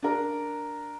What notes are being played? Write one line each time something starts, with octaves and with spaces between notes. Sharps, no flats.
D4 A#4